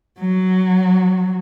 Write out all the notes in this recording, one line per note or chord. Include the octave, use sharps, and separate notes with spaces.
F#3